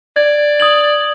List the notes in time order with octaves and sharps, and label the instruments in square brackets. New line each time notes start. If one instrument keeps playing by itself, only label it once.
[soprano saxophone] D5 [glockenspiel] G#6
[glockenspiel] D#6 G#6 F#7